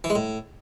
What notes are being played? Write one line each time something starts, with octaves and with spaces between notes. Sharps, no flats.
E3
G#3
A2